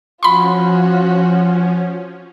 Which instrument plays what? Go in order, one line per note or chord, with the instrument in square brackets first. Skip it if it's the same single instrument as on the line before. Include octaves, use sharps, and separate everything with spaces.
[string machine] F3 C#4 [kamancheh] F4 F#4 [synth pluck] B5 C6